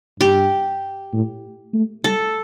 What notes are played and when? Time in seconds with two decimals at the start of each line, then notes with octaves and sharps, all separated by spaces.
0.20 G2 G4
1.13 A2
1.73 A3
2.04 G3 A4